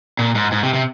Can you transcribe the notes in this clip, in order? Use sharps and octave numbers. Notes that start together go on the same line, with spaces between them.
A#2
G#2
G#2
C3
C3